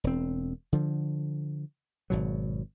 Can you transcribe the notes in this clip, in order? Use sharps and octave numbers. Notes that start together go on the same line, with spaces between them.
E1 C4
D3 F3
G#1 B2 F#3